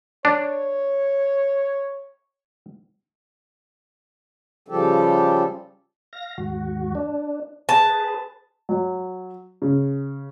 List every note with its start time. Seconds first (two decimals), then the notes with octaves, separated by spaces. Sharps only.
0.25 D4 C#5
4.68 C#3 F3 G3 G4 A4
6.13 F5 A#6
6.38 D#2 G#2 F#4
6.95 D4
7.69 G#4 B4 A5
8.69 F#3
9.62 C#3